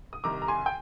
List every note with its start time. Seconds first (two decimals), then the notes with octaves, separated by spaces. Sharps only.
0.13 D#6
0.24 C2 C3 D#3 A#5 D6
0.42 A#5
0.48 G#5 C6
0.66 G5